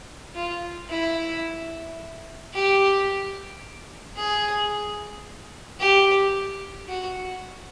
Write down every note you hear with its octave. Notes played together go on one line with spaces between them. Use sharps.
F4
E4
G4
G#4
G4
F#4